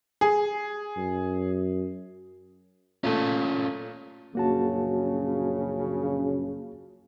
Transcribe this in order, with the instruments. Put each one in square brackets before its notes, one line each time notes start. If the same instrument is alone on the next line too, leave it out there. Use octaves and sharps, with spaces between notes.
[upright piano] G#4
[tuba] F#2
[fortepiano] A#2 A3 [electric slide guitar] C#4 F4 A4
[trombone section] A#1 F#2 C#3 [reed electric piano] A#3 F#4 A5